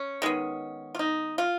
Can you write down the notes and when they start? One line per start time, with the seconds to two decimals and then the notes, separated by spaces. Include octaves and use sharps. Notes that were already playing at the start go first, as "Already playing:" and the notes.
Already playing: C#4
0.22 D#3 G#3 B3
0.95 F4
0.99 D#4
1.38 F4